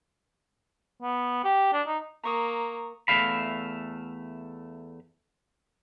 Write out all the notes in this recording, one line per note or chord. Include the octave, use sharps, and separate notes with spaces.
B3
G4
D4
D#4
A#3 A#5 C#6 D#6
E2 G2 A3 E5 F5 B5